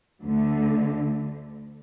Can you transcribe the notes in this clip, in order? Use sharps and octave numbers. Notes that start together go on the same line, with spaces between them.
D2 D3 A3